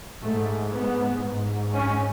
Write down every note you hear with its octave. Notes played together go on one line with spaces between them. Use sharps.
G#2 A3
B3
G#2
C#4